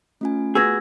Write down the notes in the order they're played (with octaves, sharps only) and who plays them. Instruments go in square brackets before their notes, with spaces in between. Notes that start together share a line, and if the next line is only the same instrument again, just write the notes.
[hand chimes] A3 F4 G#5 [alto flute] C#4
[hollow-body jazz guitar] B3 F#4 G#4 [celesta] E6 G#6 A#6